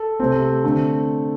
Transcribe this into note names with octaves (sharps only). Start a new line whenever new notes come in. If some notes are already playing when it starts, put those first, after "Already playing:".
Already playing: A4
C3 A3 C4
D3 A3 C4